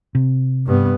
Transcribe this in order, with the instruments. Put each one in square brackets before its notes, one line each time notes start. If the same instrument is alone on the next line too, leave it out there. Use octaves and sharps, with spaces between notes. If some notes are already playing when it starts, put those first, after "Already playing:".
[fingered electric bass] C3
[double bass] G2 B3